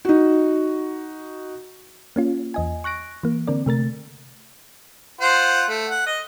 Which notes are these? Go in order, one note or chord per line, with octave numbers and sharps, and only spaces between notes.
D#4 F#4
A#3 C#4 F4
E2 D#5 G#5
C#6 F#6 A#6 D7
E3 A#3
D3 C4 A#4 D5
C3 A3 A#4 A6
F4 C5 F#5
A3
F#5
D#5